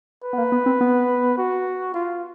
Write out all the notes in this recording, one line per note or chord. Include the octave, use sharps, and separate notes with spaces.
B4
B3
A#3
B3
C4
B3
F#4
F4